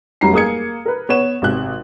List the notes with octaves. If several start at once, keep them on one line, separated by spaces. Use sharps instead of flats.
F1 F#3 G3 C#4 A#5 C7
A#3 G#4 D#6 G#6 C#7
A#4 B4
B3 C#5 E7
G#1 C3 F#6